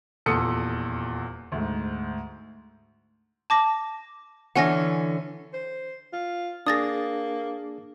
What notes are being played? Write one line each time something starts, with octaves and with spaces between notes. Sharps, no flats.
D#1 E2 A#2 A4 D#6 C#7
D2 G#2
A5 D6 A#6
D3 E3 C#4 F#5 G#5 A#6
C5
F4
A#3 D4 G#4 D#6 A6 A#6